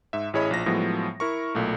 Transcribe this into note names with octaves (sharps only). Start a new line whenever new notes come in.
G#2 E5
A1 E4 G#4 C#5 D#5 B5
A#1 F3 A#6
A2 F3 F#3 G#3 B3
E4 A#4 C#6
B1 A#2 A3